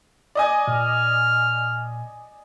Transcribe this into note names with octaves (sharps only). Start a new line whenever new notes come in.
D5 D#5 G#5
A#2 F6